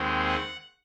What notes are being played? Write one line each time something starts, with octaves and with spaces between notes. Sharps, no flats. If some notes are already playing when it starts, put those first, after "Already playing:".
Already playing: D#2 D#3 G#3 C4
F#5